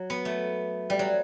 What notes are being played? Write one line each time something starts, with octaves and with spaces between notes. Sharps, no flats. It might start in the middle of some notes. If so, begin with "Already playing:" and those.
Already playing: F#3
B3
A3
G3
F#3